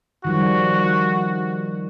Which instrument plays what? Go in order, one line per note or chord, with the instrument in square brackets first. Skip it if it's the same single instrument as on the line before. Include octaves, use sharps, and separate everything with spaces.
[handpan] D#3 F3 G3 [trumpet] F#4